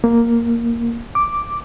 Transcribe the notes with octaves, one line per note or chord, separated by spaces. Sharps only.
A#3
D6